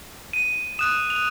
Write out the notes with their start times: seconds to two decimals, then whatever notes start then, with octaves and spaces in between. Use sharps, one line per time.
0.33 D#7
0.79 D#6 F#6 E7
1.10 F7